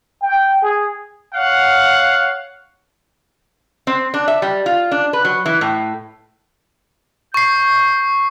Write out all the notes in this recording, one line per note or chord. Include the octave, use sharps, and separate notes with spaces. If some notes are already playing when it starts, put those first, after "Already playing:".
G5
G#4
C#5 F5 F#5
C4
D4
E5
G3
F4
D4
B4
F#3
E3
A2
C#6 G6 C7